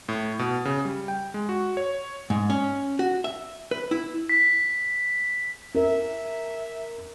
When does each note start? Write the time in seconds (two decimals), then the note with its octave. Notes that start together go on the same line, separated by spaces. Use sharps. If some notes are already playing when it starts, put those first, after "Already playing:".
0.09 A2
0.39 B2
0.65 C#3
0.85 G3
1.08 G5
1.34 G#3
1.49 F#4
1.77 C#5
2.30 G#2
2.50 C#4
2.99 F#4
3.24 E5
3.71 B4
3.91 E4
4.29 B6
5.75 A#4 E5